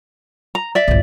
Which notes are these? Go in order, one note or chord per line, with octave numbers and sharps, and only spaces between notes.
A#5
D5 E5
G1 C2